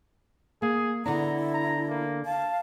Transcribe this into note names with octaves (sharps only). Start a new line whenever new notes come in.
A#3 G#4
D3 B3 D4 E4 A#5
A#5
A#3
F5 A5